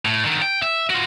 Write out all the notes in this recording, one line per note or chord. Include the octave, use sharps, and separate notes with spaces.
A2
D3 D#3
G5
E5
F4 F#4